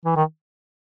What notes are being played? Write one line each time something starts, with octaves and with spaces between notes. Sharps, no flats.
E3
D#3